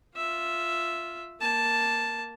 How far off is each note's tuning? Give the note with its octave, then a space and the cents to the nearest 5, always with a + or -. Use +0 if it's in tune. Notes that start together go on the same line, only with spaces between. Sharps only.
F4 +0 E5 +0
A#3 +0 A5 +0